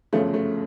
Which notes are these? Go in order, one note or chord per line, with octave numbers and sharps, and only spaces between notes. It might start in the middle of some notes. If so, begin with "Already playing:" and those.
G1 F#2 C#3 F3 A3
A3